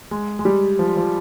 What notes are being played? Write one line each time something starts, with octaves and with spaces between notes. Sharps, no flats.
G#3
G#3
G3
F3
F3